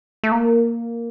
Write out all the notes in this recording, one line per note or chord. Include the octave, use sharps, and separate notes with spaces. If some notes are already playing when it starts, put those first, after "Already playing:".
A3
A#3